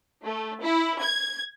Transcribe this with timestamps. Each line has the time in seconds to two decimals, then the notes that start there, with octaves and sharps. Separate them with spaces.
0.24 A3
0.62 E4
1.02 G#6